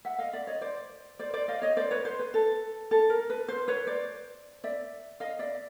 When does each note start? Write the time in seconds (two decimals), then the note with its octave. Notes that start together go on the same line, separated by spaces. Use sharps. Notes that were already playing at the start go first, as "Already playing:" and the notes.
0.05 E5 F#5
0.18 D#5 F5
0.33 D5 E5
0.47 C#5 D#5
0.61 C5 D5
1.19 C5 D5
1.33 C5 D5
1.48 D#5 F5
1.62 C#5 D#5
1.76 C5 D5
1.91 B4 C#5
2.05 C5
2.19 B4
2.34 A4
2.91 A4
3.10 A#4
3.30 B4
3.48 C5
3.68 B4 C#5
3.87 C5 D5
4.64 D5 E5
5.20 D#5 F5
5.39 D5 E5